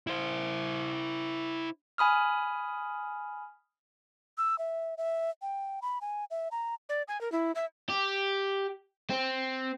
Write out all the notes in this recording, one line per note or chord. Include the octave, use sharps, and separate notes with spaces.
E4 C5
G#5 B5 D#6 F6
E6
E5
E5
G5
B5
G#5
E5
A#5
D5
G#5
A#4
E4
E5
G4
C4